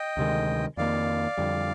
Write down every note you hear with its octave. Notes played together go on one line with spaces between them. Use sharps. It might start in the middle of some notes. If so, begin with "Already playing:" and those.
Already playing: D#5 G5
D2 C3 D#3 G#3
F2 D#3 A#3 D5 F5
F2 D3 G3